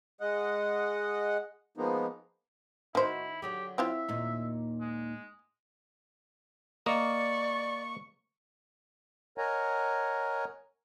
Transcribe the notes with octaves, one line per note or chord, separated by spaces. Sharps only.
G#3 D#5 F#5
F3 G#3 A#3 B3 D#4
D#3 D#4 E4 F#4 C5
D3 F#3 G4 G#4
C4 E4 F4 E5
D#2 A#2 D#4
G#3
A#3 D5 D#5 C#6
A#4 C#5 D#5 F#5 G#5 A#5